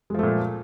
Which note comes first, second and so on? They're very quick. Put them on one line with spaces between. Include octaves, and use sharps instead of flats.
G#3 F3 A3 A#2